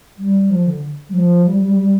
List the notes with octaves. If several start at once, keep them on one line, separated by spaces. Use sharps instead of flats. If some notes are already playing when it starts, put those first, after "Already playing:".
G3
F3
D3
G3
F3
G3
G3
G3